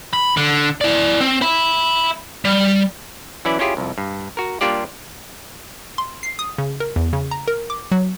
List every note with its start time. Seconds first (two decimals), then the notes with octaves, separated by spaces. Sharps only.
0.13 B5
0.37 D3
0.81 E4 D5
1.21 C4
1.42 E5 B5
2.45 G3
3.45 E3 F#3 C#4 E4 D5
3.59 C#4 E4 F4 G4 G#4
3.77 C2 F2
3.98 G2
4.37 F#4 A#4
4.61 G3 A#3 D4 F4 G4 D5
5.98 C6
6.23 C7
6.39 D#6
6.58 C#3
6.80 A#4
6.96 E2
7.13 C#3
7.31 A#5
7.48 A#4
7.70 D6
7.92 F#3